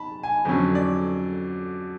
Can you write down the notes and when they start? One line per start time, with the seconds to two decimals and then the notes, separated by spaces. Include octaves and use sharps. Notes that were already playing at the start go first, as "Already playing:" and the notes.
Already playing: A5 B5
0.23 G#5
0.45 F2 D3 F#3 C#4
0.75 D5